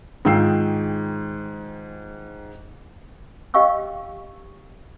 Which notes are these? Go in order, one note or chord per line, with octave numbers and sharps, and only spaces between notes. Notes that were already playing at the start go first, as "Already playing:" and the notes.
G#2 D#3 F4 G5 E6 C7
G4 D#5 F5 G5 C#6 E6